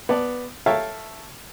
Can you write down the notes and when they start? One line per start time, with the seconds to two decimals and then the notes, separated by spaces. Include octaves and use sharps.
0.09 B3 D5 A5
0.66 A4 C#5 E5 F5 G5 A5